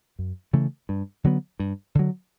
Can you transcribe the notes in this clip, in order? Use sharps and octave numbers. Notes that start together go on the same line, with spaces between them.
F#2
C#3 E3 A3
G2
D3 F#3 B3
G2
D3 F#3